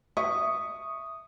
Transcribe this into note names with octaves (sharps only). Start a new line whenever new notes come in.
E5 C#6 D#6